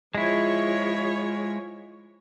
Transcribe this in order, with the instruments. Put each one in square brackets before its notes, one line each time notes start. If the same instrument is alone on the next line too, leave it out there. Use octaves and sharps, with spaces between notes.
[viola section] F3 G#4 C#5 [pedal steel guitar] G#3 E4